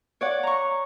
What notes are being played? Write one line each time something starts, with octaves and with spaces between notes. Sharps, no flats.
C#5 D5 F#5
A#5 C#6